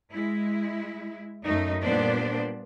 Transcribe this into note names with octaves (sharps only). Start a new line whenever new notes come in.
G#3 E4
F#2 A3 D#4
A#2 G3 B3 D4 C5 D5